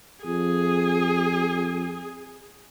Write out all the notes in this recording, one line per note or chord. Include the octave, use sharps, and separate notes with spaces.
F2 G#4